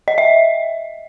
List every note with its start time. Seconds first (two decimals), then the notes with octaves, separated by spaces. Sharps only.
0.08 D#5
0.18 E5